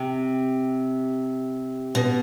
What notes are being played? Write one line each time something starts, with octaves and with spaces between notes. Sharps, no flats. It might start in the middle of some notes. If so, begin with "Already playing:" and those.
Already playing: C3
B2